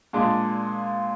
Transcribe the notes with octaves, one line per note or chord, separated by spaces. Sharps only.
A#2 G#3 D4